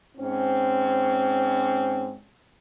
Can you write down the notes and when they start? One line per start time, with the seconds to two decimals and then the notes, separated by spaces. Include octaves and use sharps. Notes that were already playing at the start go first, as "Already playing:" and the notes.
0.17 G#2 C4 C#4